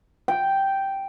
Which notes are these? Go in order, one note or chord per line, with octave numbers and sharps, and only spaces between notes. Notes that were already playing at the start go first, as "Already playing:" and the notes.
G5